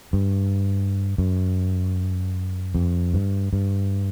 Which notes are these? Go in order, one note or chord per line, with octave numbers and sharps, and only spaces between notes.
G2
F#2
F2
G2
G2